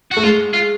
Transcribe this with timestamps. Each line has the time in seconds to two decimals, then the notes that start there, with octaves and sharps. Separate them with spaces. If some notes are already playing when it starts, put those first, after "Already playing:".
0.11 F#4
0.17 A3
0.24 G#3 F4
0.53 F4